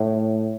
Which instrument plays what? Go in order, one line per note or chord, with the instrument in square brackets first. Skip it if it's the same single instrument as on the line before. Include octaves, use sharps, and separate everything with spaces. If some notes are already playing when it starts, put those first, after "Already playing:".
Already playing: [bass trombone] A2